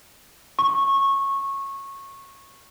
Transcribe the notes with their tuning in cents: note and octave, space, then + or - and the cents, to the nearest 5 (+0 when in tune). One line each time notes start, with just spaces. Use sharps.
C#6 -15